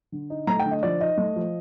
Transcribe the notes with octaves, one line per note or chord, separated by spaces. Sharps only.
D3
D#4
A3 A#5
G5
D3
D#5
F3 D5
D#4 D#5
A3
F3